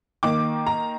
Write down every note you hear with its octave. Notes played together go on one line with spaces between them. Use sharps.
D#3 A#3 D#4 D6
A#5